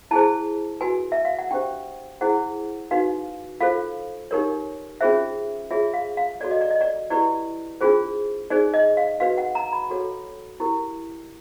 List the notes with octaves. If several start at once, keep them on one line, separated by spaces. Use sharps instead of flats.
E4 G#4 C5 A5
F#4 B4 G#5
E5
F5
F#5
D4 G4 C5 G5
E4 G#4 C5 F#5
D#4 F#4 B4 F5
F4 A4 C5 F5
D#4 G4 A#4 C#5
C#4 F4 G#4 C5 E5
F4 G#4 C#5 E5
F5
F5
F#4 A4 C#5 D5
D#5
D5
D#5
D5
E4 G4 B4 D5
D4 F4 G#4 C5
D#4 G#4 C5 D5
D#5
F5
F#4 B4 F5
F#5
A#5
B5
F#4 A4 C#5
E4 G4 A#4